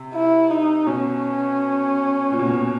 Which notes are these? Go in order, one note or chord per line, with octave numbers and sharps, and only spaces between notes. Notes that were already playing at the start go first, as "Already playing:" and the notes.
Already playing: C3
E4
D#4
B2 C#4
A#2
B2
A#2